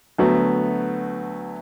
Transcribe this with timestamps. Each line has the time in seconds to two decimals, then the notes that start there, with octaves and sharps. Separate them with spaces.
0.18 D2 F#3 A3 B3